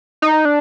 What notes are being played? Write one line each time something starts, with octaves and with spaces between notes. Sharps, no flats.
D#4
D4